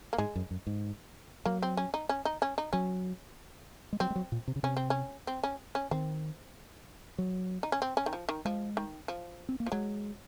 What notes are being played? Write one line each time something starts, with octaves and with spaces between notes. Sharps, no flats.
A#3
G#2 G#3
F#2
F#2
G#2
F#3 A#3
C4
C#4
D#4
C#4
D#4
C#4
D#4
F#3 C#4
G#3
F#3 C4
G#3
F#3
A#2
C3
C#3
C3 C#4
C4
C#4
C4
C#4
C#4
D#3 C4
F#3
D#4
C#4
C4
C#4
D#3
F3
D#3
F3 G#3
D#3
F3
C4
A#3
F3
F#3 G#3